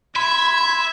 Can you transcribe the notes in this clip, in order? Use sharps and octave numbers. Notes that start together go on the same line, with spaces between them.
E5 B5 C6 G#6